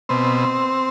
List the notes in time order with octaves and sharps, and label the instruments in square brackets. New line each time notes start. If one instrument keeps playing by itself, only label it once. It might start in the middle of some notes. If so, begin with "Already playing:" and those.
[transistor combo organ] B2 C4